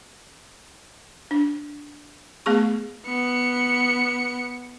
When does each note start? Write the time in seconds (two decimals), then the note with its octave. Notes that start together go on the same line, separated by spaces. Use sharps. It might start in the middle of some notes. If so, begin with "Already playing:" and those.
1.31 D4
2.46 A3 B3 G#4 C#6
3.07 B3 C#7